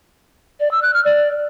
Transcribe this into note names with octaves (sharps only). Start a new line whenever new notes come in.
D5
E6
F#6
F6
D5